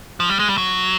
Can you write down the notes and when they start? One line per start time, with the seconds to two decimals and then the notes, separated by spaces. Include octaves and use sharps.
0.20 F3
0.30 G3
0.39 G#3
0.49 G3
0.58 F#3